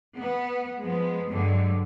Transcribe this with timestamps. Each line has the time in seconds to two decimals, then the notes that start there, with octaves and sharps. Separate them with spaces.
0.17 B3
0.82 F3 G#3 B3
1.29 G2 D3 F#3 G#3